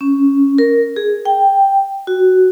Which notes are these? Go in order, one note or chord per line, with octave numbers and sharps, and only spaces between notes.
C#4
A#4
G#4
G5
F#4